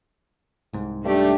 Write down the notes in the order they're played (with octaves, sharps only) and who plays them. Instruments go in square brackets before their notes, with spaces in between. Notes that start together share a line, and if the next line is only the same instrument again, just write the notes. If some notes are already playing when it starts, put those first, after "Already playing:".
[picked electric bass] C2 G#2
[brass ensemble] G2 A3 [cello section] D4 G4